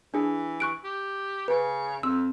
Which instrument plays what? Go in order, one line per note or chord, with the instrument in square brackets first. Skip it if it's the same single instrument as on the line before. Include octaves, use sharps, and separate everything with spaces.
[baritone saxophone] E3 [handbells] D4 G#4
[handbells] C#6 F#6 D7
[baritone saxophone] G4
[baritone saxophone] C#3 [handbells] B4
[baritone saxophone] F2 [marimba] C4 [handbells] E6